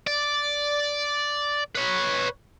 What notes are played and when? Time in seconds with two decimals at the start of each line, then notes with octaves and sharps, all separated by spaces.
0.07 D5
1.76 B4 C#5